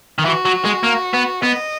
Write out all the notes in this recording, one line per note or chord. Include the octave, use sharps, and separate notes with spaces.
D#3
E3 F#4
F#3
G#3
A#3
B3
B3 D#5